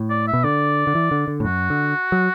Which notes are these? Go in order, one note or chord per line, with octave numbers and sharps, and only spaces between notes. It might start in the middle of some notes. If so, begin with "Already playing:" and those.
Already playing: A2
D5
E5
B2
D3 D5
D3
E3
D3
D3
A2
F#2 F#4
D3
F#3